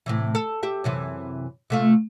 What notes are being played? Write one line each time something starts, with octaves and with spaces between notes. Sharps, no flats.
A2 C3 E3
A4
G4 E5
F#2 C3 E3
C3 A3 F4